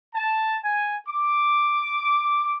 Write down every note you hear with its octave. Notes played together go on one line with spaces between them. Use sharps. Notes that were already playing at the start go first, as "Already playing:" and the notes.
A5
G#5
D6